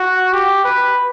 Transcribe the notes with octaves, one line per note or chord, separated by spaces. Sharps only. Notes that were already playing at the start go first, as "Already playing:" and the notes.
Already playing: F#4
G4
B4